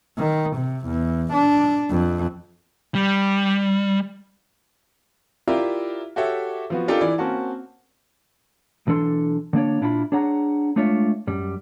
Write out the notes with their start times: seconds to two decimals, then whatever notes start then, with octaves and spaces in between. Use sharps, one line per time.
0.18 D#3
0.57 C3
0.87 E2
1.34 D4
1.91 F2
2.95 G3
5.48 E4 F4 G4 A#4 D5 E5
6.16 F#4 G4 A4 C#5 E5
6.70 F3 B3 F#4
6.88 D4 D#4 F4 G4 A4 A#4
7.01 E3 E4 D5
7.18 A#3 C4 C#4 F#4 A5
8.87 B1 E3 D4 A4 C6
9.53 D3 A#3 D4 C#5
9.81 A#2 D4 E4 F4 F#5 B5
10.12 D4 G#4 C#5 F#5 A#5
10.76 G#3 A3 D4 F4 C#5 E5
11.27 F#2 G3